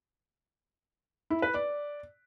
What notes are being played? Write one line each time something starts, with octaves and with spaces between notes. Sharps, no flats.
E4
B4
D5